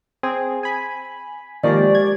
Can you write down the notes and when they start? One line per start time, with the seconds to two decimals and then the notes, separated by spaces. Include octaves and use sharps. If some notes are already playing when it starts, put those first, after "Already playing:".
0.23 C4 G#4
0.63 G#5 B5
1.63 D#3 F3 G#3 A#3 G4 D5 C#6
1.95 G#6